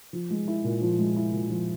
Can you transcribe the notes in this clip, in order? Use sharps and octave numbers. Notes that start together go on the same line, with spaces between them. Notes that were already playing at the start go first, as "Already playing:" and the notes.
F3
G#3
E4
A#2
F3
G#3
E4
A#2
F3